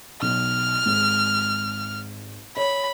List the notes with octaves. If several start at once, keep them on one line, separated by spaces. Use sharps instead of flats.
B1 F6
G#1
C#5 B5